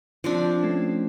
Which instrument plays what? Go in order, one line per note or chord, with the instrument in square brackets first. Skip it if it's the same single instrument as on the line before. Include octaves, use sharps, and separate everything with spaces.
[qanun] F3 C4 D4
[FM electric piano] A3 C#4